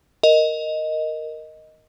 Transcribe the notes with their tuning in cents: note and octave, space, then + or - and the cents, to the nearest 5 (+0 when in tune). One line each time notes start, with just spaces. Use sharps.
A#4 +0 D#5 +0